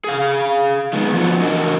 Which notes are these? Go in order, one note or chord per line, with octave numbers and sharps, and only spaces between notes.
G#4 F5
D#3 G#3 B3
F3 B3 F#4
E3 D4 F#4 A#4 D#5